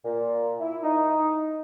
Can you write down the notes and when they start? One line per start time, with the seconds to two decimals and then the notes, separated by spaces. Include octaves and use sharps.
0.05 A#2
0.60 E4
0.83 D#4